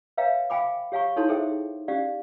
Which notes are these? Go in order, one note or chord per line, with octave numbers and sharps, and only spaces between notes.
B4 C#5 E5 F5 G5 A#5
F5 G5 G#5 B5 D6
G4 C#5 F5 G#5 A#5 C#6
D#4 E4 A4 C#5 A5 C6
G#4 A4 C5 E5 G5
C#4 G4 D5 F5